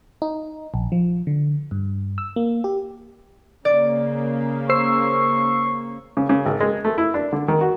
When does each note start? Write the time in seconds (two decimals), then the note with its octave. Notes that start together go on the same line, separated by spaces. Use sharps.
0.22 D#4
0.74 A#1
0.92 F3
1.27 D3
1.71 G2
2.18 E6
2.36 A#3
2.64 G4
3.65 C#3 A#3 D5
4.69 C5 C#6 E6 C7
6.17 C#3
6.29 C#3
6.46 G#1
6.60 G#3
6.85 A3
6.98 E4
7.14 D4
7.33 D3
7.48 D#3
7.61 F#4